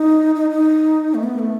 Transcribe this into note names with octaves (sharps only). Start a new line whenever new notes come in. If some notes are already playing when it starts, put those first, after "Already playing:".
Already playing: D#4
D#4
D#4
A3
B3
A3